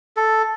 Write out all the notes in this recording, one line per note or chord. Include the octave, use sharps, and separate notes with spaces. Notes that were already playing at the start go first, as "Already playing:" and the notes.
A4